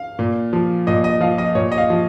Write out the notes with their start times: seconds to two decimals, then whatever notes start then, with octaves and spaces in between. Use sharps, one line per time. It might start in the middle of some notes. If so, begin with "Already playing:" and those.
Already playing: F5
0.19 A#2
0.53 F3
0.87 A#2 D#5
1.04 D#5
1.21 F3 F5
1.38 D#5
1.55 A#2 C#5
1.72 D#5
1.78 F5
1.90 F3